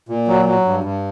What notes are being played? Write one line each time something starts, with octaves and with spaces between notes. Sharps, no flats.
A#2
F#3
F#3
G2
G2